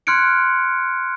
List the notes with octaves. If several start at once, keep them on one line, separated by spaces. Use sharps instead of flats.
C6 F6 F#6 G#6 C#7 D7